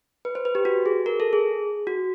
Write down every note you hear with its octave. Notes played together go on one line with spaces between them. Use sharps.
B4
C5
B4
G4
F#4
G#4
A#4
A4
G#4
F#4